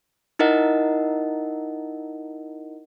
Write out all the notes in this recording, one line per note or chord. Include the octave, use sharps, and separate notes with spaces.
D#4 E4 A#4 D#5 F#5